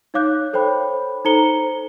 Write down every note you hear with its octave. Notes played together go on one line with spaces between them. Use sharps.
D#4 C#5 F5 D6 F#6 G6
A4 C5 C#5 G5 B5
D#4 A4 C5 A#5 C#7 G7